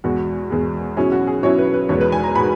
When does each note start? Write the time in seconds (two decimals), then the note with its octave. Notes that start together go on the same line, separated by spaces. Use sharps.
0.04 E2 B2 G#3 F#4
0.50 E2 B2 G#3
0.96 B2 F#3 C#4 E4 G#4
1.12 F#4
1.27 G#4
1.43 B2 F#3 C#4 E4 C#5
1.58 B4
1.74 B4
1.89 E2 B2 G#3 B3 C#5
2.01 B4
2.12 G#5
2.24 A#5
2.35 B2 G#3 B3 B5